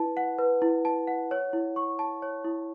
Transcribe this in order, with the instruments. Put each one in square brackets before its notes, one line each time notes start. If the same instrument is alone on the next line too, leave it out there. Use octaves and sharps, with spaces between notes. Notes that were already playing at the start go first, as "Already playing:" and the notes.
Already playing: [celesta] E4 B4 A5
F#5
B4
E4
A5
F#5
C#5
E4
C#6
A5
C#5
E4